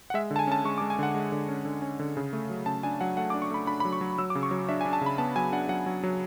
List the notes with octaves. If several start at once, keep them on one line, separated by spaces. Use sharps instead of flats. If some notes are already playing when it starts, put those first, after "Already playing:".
F#5
G#3 E5
D3
A5
G#5
C#4 A5
G#3 C#6
D6
G#3
G#5
D3 F#5
G#3
D3
C#4
D3
C#4
D3
C#3
A3
F#3
C#3 A5
D4 G#5
F#3 F#5
A3 F#5
D6
D4
C#6
A3 B5
D4 B5
B5
F#3
C#6
F#3
F#3 E6
D6
C#3
C#6
F#3
D4 E5
G#5
D4
A5
C#3 B5
B3 A5
F#3 G#5
D4 F#5
F#3 F#5
F#3
F#3